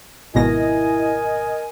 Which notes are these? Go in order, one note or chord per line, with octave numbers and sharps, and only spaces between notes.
G#1 B2 E4 A#4 D#5 G#5 A#6